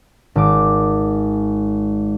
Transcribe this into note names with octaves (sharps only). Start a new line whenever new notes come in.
G#1 D6